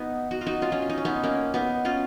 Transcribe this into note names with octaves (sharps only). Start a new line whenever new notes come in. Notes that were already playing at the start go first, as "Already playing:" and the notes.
Already playing: B3 D#4
D#4 F#4
F4
D#4 F#4
C#4 F4
C#4 F4
F4
D#4
C#4
B3 D#4
A#3 C#4
B3 D#4
C#4 F4